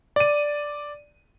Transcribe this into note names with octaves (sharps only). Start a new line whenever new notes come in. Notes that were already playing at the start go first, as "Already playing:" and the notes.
D5 D#7